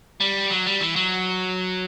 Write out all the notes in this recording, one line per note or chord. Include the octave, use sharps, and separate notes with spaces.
G3
F#3
G3
E3
F#3